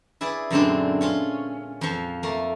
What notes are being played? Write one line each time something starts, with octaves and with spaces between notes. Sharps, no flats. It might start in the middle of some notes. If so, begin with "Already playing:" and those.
E4 G#4 B4 D5
F#2 A#2 D3 G#3 C4 D4
C#4 F4 C#5
F2 F3
A3 A#3